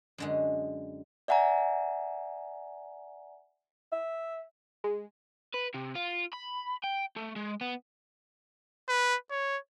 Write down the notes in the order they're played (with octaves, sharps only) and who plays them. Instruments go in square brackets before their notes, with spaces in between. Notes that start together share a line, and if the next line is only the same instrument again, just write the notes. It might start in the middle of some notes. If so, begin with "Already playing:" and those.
[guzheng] F#2 D3 G#3
[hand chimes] D5 E5 F#5 G#5 A#5
[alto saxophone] E5
[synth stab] G#3
[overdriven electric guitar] B4
C3
F4
B5
G5
A3
G#3
B3
[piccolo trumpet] B4
C#5